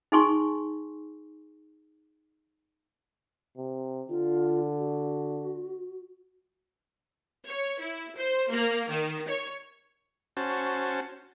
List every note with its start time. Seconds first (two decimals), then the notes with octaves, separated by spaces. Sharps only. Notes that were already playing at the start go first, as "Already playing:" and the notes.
0.12 D#4 G#4 G#5 C6 C#6
3.57 C3
4.09 D3 F4
4.78 F#4
7.45 C#5
7.80 E4
8.16 C5
8.49 A#3
8.88 D#3
9.28 C#5
10.37 C#4 F#4 C5 A5